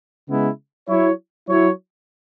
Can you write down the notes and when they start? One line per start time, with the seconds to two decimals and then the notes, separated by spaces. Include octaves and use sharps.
0.28 C#3 G#3 B3 E4
0.88 F#3 E4 C#5
1.48 F#3 E4 C#5